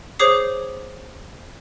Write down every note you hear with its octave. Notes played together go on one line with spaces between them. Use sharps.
G#4 C5 C#5 D6 D#6 C7